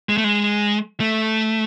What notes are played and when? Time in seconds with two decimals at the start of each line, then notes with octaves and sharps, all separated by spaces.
0.09 G#3
0.17 A3
0.24 G#3
1.00 A3